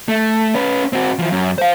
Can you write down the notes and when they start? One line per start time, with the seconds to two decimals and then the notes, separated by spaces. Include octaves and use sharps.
0.08 A3
0.55 C#4 B4
0.93 C4 F#4
1.19 E3 F3
1.31 F#2
1.58 C5 F5